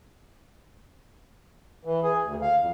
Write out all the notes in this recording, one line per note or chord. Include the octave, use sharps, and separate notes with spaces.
E3
G#4
D2
F5
F2